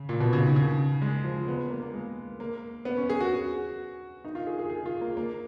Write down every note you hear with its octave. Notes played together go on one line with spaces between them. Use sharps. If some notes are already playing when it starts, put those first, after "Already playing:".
Already playing: C#3
A#2
B2
C#3
D#3
C#3
G#3
F3
B3
A#3
A#3
G#3
A#3
B3
C#4
G#4
F#4
D#4
F4
G#4
G#4
G#4
F4
A#3
A#3